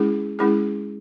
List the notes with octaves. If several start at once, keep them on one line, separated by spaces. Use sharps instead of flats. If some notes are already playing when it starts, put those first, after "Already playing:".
Already playing: G#3 C#4 E4 G#4
G#3 C#4 E4 G#4